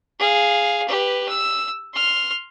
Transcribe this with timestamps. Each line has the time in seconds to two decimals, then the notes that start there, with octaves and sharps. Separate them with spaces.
0.19 G#4 F5
0.88 G4 B4
1.28 E6
1.94 C6 F6